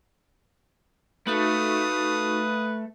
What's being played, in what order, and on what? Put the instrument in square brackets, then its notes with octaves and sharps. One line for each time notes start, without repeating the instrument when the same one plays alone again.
[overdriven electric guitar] A3 [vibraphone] D#4 F#4 C#6 [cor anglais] B4 [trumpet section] F5 D#6